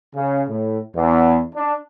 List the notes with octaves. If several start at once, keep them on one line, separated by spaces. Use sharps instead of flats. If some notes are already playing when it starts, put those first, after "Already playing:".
C#3
A2
E2
D4